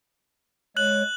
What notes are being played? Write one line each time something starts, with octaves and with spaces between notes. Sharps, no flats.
G#3 C#5 F#6 F#7